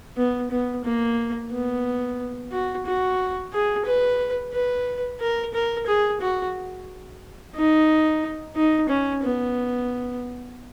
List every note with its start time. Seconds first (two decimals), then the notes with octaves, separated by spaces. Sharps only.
0.17 B3
0.51 B3
0.85 A#3
1.51 B3
2.52 F#4
2.86 F#4
3.53 G#4
3.85 B4
4.53 B4
5.20 A#4
5.54 A#4
5.87 G#4
6.21 F#4
7.55 D#4
8.56 D#4
8.89 C#4
9.23 B3